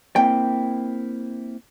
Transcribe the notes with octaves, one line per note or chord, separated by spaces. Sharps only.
A#3 C4 E4 G5